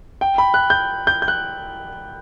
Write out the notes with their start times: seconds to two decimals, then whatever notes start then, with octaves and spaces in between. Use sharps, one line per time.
0.21 G5
0.38 B5
0.54 F#6
0.70 G6
1.07 G6
1.22 G6
1.28 F#6